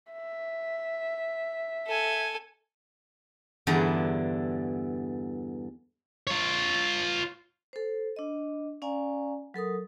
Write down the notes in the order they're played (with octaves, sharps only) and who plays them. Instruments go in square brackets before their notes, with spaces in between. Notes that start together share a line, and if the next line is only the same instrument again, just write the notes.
[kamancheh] E5
[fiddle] A4 G#5
[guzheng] E2 G2 D3 D4 E4 A#5
[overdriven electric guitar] F4 C#5
[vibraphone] A4 C5
D4 D#5
C#4 D5 F5 G#5 A#5
F#3 A4 A#4 D#6